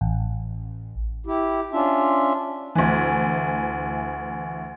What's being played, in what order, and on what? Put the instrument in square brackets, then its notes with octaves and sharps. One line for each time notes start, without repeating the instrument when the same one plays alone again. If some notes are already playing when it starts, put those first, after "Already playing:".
[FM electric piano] A1
[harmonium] E4 G4
C#4 D4 F4 E5
[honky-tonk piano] D2 E3